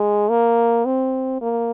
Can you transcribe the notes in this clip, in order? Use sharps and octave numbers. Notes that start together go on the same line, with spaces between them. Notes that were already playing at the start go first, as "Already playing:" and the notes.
Already playing: G#3
A#3
C4
A#3